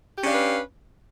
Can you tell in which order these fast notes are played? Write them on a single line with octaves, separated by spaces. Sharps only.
G4 C#4 D4 F5 B4